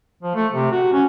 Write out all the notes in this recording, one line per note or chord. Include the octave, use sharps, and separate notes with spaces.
F3
A3
C3
F#4
C#4